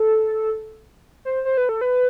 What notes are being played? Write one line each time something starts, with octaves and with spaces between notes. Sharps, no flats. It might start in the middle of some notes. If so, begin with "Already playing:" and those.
Already playing: A4
C5
C5
B4
A4
B4